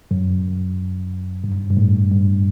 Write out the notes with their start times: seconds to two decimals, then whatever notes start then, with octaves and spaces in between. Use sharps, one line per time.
0.11 F#2
1.44 G2
1.71 G2
1.77 A2
2.11 G2